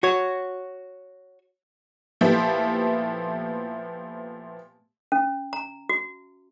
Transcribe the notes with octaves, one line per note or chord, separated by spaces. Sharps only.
F#4 C#5
A#2 F3 A3 B3 E4 G4
C#4
A#5
F#4